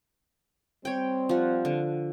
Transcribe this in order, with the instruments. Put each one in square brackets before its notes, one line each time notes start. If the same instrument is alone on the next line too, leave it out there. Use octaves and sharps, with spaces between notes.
[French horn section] G3 C4 [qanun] C#5 G5
[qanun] F3 F#5
D3